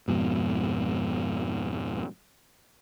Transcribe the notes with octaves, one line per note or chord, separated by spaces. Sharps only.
F2 G#2 B2